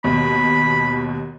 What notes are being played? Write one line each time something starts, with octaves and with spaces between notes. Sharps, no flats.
D#2 B2 B5